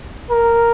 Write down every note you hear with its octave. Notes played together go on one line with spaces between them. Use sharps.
A#4